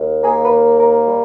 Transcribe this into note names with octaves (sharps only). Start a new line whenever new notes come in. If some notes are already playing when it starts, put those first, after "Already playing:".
Already playing: D#2
A#3 G#4
B4
D#2
A#3 A#4
G3